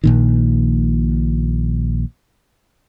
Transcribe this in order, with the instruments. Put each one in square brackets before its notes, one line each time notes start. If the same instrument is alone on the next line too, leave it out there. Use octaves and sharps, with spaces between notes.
[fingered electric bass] A#1 A#2 D#3